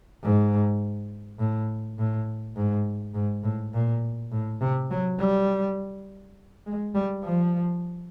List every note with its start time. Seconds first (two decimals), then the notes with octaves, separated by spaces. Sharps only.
0.23 G#2
1.39 A2
1.98 A2
2.56 G#2
3.14 G#2
3.44 A2
3.73 A#2
4.32 A2
4.61 C3
4.91 F#3
5.19 G3
6.66 G#3
6.95 G3
7.24 F3